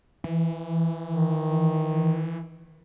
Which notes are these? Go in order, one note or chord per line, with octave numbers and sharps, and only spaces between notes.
E3
D#3